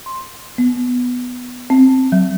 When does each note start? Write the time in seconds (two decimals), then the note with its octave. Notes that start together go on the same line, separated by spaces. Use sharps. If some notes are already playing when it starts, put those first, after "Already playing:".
0.06 C6
0.58 B3
1.70 C4
2.12 F#3